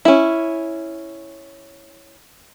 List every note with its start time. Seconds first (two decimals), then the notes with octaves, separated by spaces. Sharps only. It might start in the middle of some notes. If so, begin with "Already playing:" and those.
0.05 C#4 E4